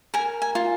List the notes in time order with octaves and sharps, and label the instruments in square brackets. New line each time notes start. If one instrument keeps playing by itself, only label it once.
[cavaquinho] A#4 G#5
G#5
F4